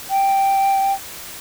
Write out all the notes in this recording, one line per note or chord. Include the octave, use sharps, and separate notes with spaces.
G5